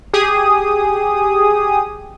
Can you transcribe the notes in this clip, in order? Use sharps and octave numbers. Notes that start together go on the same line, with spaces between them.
G4 G#4 D#6